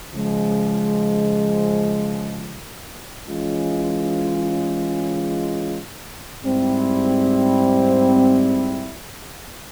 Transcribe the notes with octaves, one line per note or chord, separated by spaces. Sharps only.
C#3 F3 G#3
E3 G#3 C#4 F4
G#2 G3 C4 E4